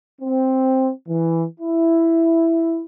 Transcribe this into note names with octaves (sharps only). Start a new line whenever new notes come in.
C4
E3
E4